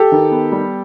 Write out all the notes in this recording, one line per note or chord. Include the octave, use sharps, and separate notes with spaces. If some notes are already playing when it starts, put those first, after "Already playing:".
Already playing: G4 A4
D#3
B3
G3